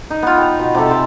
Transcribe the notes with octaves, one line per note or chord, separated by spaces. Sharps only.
D#4
B3 F4
G5 A#5
B2
C3 G4 A4
A4 C5 G5 G#5